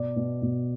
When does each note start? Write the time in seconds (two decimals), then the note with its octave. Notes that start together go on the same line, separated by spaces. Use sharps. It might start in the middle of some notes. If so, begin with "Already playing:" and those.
Already playing: B2 D5
0.16 B2
0.42 B2